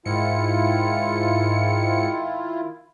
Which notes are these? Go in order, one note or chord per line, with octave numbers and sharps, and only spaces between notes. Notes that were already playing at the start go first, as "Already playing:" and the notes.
G#2 D#3 E4 F4 C#7